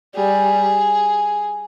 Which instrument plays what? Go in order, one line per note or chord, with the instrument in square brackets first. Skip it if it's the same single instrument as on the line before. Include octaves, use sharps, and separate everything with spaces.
[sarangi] G3 [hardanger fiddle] G#4